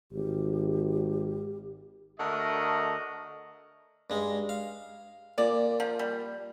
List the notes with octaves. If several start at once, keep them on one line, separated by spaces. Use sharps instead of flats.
G#1 G4
D3 A3 F#4 A#4 D#5
G2 G#3
F5
A#2 D5
F3
G3